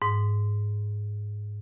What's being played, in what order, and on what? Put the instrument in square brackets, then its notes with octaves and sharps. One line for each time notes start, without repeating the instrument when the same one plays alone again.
[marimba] G#2